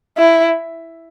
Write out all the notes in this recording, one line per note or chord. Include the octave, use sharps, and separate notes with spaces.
E4